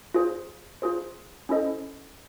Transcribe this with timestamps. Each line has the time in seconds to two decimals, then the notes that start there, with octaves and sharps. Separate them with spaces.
0.14 F4 G#4 C5
0.82 F4 G#4 C5
1.49 C#4 E4 A4 C5 D#5